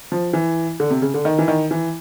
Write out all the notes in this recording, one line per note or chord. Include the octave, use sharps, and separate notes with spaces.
F3
E3
D3
C3
C#3
D3
D#3
E3
D#3
E3